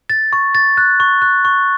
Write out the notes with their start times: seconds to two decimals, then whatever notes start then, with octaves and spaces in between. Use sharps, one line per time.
0.10 A6
0.33 C#6
0.55 A6
0.77 F#6
1.00 C#6
1.22 F#6
1.45 C#6